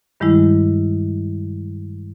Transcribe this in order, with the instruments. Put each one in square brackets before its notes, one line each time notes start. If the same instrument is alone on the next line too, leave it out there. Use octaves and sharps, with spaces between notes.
[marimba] G2 D#3 G3 G#3 E4